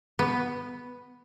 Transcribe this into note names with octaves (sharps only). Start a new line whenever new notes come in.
B3